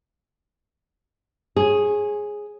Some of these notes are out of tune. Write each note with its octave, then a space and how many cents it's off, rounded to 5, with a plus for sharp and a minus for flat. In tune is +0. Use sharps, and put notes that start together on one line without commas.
G#4 +0 C#5 -30